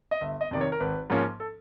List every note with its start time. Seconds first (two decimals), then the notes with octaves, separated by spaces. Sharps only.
0.11 D#5
0.21 G1 E5
0.41 D#5
0.51 F2 C3 D#3 D5
0.61 C#5
0.72 A#4
0.80 G#1 B4
1.10 G#2 F3 A#3 C#4
1.40 A4